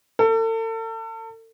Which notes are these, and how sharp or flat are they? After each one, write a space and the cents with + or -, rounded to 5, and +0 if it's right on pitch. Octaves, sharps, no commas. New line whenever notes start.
A4 +40